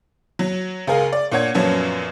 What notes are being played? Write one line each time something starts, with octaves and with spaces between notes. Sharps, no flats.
F#3
C#2 G#4 A#4 F5
D5
A#2 D4 C#5 F#5 G#6
F#2 A#2 F3 F#3 B3 C#4